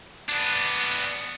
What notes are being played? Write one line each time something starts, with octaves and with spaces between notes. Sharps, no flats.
B3 D4